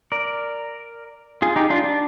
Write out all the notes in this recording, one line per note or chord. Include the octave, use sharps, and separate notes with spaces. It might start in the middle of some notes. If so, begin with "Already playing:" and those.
A#4 D5
F4 G#4
D#4 G4
D4 F4
D4